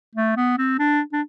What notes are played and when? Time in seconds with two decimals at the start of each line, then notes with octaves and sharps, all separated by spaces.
0.15 A3
0.37 B3
0.58 C4
0.79 D4
1.13 D4